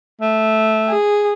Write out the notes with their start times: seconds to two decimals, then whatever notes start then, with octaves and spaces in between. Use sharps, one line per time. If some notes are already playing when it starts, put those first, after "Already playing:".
0.21 A3
0.88 G#4